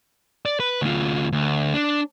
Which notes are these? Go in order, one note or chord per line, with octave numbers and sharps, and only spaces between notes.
D5
B4
D2 F4
D2
D4